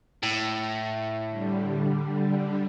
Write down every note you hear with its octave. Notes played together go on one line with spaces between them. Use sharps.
A2
D3 G3